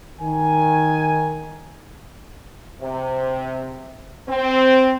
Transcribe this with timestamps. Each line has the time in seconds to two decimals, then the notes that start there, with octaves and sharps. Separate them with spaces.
0.20 D#3 G#5
2.80 C3
4.28 C4